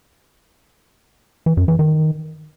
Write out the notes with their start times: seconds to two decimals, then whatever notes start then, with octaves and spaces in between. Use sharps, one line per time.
1.46 E3
1.57 F#2
1.68 E3
1.79 D#3